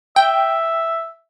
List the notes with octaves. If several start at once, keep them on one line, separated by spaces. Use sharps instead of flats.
E5 G5